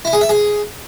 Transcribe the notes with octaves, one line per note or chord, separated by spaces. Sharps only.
E4
G#4
E5
G#4